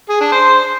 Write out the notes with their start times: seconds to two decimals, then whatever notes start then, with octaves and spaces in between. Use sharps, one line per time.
0.09 G#4
0.21 D4
0.32 C5